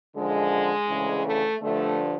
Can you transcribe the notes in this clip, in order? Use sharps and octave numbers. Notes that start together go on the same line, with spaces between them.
F#2 D3 F3 G#3
D2 C#3 E3
A3
G2 D3 F3 A3